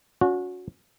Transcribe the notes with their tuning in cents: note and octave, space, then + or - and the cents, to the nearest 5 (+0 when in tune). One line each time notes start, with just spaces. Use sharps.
C#4 +30 F#4 -25